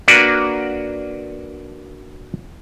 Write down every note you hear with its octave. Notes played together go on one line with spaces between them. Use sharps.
A#3 D4 F#4 B4 D5